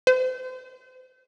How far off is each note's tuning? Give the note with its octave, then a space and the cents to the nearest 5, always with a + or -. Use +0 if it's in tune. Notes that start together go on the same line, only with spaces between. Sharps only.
C5 -30